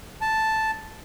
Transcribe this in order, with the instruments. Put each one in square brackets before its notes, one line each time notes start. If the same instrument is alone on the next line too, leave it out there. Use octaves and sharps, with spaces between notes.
[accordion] A5